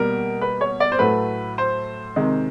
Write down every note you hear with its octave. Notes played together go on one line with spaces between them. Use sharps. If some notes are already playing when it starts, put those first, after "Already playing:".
Already playing: B2 G3 A#3 A#4
B4
C#5
D5
C5
A2 F#3 A3 B4
C5
C3 D#3 G#3